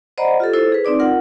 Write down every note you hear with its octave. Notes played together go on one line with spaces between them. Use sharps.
C5 D5 D#5 F#5 A#5 B5
F4 G4 A4
E4 A4 C5
G#4 B4
C4 D#4 D5 D6
F4 A#4 F#5